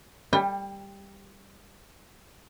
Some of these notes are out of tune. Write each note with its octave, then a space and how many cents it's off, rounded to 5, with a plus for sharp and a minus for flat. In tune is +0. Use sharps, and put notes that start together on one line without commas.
G3 +10 G5 +35